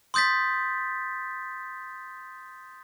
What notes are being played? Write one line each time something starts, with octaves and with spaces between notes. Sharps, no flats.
C6 D#6 G6 A6 B6